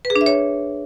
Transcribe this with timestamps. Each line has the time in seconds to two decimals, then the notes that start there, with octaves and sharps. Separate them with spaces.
0.05 B4
0.10 G#4
0.16 D4
0.21 E5
0.26 C#5